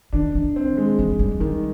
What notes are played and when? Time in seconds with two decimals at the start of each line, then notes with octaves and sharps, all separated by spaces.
0.13 D#3 D4
0.35 D#3
0.56 C4
0.77 G#3
0.99 E3
1.09 F3
1.19 G3
1.40 D#3 G3